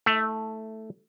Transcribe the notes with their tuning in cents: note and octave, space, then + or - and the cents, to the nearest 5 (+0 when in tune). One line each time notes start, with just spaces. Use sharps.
A3 +0 E4 -35